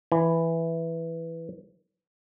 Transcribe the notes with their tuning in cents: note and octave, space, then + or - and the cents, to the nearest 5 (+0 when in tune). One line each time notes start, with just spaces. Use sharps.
E3 +0 G#5 +0